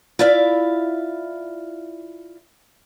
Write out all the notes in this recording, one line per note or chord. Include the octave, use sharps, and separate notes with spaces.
E4 F4 D5 E5 F5